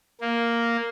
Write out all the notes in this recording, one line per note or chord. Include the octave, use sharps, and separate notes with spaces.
A#3